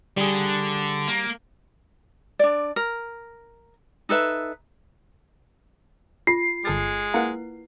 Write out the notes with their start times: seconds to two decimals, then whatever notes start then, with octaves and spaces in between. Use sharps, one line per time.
0.17 D3 G3 G#4
1.07 A#3
2.39 D4 D5
2.76 A#4
4.09 D#4 A4 B4 E5
6.27 F4 C7
6.65 G1 G#3 A4 A6
7.14 A#3 E4 B4 F#5